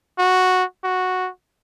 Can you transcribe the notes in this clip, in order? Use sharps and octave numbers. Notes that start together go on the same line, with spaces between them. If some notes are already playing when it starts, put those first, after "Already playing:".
F#4
F#4